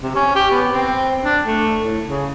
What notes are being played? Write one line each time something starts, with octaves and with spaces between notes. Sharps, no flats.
C3
C#4
G4
B3
C4
D4
A3
A2
C#3